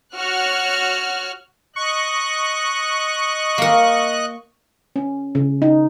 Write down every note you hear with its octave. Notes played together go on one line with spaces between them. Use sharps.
F#4 C#5 F6 F#6
D#5 C#6 F#6
A#3 A#4
C#4
C#3
D#4